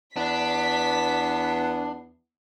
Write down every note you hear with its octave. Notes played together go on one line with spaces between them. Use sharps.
E2 B3 D4 B6